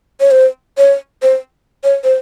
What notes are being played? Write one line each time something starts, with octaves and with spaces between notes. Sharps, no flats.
C#5
C5
C#5
C5
C#5
C5